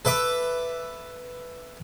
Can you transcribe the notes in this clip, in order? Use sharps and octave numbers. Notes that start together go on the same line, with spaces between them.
A4 B4 E5 D6